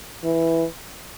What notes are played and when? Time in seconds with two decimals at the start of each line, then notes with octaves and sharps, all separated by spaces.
0.24 E3